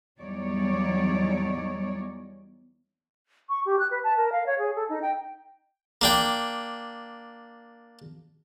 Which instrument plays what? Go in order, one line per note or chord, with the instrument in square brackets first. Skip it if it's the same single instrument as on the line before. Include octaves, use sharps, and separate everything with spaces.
[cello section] E2 F#3 G3 D#4 C#5 D5
[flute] C#6
G4
F#6
B4
A5
A#4
F5
C#5
G#4
A4
D#4
G5
[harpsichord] A#3 D4 G5